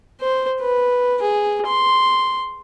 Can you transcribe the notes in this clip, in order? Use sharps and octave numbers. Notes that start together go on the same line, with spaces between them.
C5
B4
G#4
C6